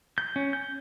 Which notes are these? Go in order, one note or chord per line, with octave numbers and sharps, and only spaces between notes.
G6
C#4
G6